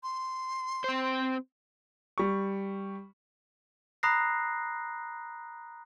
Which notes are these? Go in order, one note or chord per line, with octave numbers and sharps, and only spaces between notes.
C6
C4 C5
G3 C#6
A#5 B5 D#6 F#6 A#6 C7